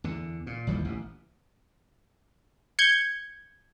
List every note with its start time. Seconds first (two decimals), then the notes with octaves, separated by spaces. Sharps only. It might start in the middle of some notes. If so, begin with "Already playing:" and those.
0.04 E2 D3
0.47 A#2
0.67 G1 D#2 E3 F3
0.85 A1 B2
2.79 G6 G#6 C#7